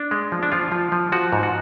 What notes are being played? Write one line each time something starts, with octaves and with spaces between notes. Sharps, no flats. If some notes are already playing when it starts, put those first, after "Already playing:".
Already playing: D4
G#3
F3
D4
F3 F4
F3
F3
F3 F#4
G#2
F#4